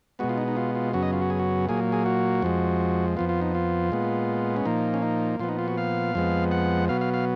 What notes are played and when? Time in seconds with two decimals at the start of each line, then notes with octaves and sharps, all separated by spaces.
0.19 B2 G#3 B3 F#4
0.29 F4
0.38 D#4
0.48 D#4
0.57 F4
0.75 F4
0.93 F#2 C#3 F#3 B3 F#4
1.03 D#5
1.13 F4
1.22 F#4
1.30 G#4
1.39 F#4
1.68 A#2 F#3 A#3 G#4
1.92 G#4
2.06 F#4
2.42 F2 F3 G#3
3.17 F2 F3 B3 F4
3.29 F4
3.41 D#4
3.55 F4
3.92 A#2 G#3 B3
4.56 C#4
4.65 A#2 F3 A#3 D#4
4.94 C#4
5.02 D#4
5.39 A#2 F3 B3 F4
5.49 D#4
5.59 F4
5.68 F#4
5.78 F5
6.15 F2 F3 G#3 B3
6.51 F#5
6.88 B2 F#3 B3 F5
7.01 F5
7.14 F5